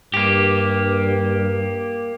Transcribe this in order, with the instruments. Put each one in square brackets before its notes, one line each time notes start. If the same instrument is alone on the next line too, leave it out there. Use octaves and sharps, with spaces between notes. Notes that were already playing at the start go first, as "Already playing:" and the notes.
[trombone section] G2 [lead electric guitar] A#3 G4